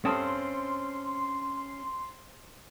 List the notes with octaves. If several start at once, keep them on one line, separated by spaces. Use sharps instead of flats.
G2 C4 C#4 A4 C6 D#6